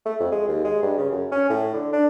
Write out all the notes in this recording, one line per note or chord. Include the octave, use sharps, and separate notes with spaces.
A3
F2
G#3
D#2
G#3
G2
C#3
F#2
C#4
A2
D3
D4